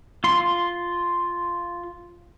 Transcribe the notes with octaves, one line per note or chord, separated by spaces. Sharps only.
F4 C6